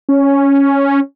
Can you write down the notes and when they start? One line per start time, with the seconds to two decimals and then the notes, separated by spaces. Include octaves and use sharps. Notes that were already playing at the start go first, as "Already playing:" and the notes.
0.09 C#4